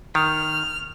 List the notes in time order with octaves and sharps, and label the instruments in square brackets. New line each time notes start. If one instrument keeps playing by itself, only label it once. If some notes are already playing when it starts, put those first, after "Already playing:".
[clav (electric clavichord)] D#3 [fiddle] F6